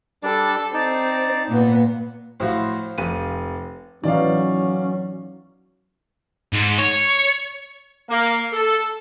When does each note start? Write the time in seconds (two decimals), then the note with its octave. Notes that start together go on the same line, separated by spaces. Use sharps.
0.23 G3 D4 A4 D5
0.74 C4 D#4 D5 A5
1.47 A#2 B3
2.40 A2 F3 E4 F#4 C5
2.98 F1 D#7
4.04 E3 F#3 C#4 D#4 D5 F5
6.53 G#2
6.78 C#5
8.09 A#3
8.52 A4